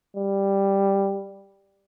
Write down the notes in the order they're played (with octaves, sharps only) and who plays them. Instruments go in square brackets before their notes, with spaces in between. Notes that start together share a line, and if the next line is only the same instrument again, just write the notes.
[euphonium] G3